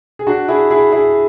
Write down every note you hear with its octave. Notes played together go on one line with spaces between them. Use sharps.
G#4
D4 F#4
E4 G#4
E4 G#4
E4 G#4